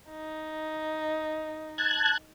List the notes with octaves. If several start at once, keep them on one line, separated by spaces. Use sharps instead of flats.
D#4
A5 F#6 G#6